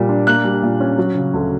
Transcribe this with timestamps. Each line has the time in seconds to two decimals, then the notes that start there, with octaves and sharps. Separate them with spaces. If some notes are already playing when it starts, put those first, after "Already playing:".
Already playing: A#2 G3 A#3
0.09 D4
0.27 A#3 F#6
0.44 G3
0.63 A#2
0.80 C#4
0.98 F#3
1.15 C#3
1.34 D2